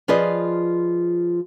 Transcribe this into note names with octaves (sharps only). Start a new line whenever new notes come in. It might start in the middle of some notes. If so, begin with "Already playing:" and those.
F3 F4 G#4 B4 D5 D#5